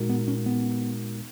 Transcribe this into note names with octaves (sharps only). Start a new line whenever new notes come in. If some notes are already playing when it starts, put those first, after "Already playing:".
Already playing: A#2 G#3 D#4 F#4 A#4
B3
C#4
B3